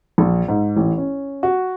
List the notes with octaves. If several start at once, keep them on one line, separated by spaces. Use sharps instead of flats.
A#1
G#2
A1
C#4
F#4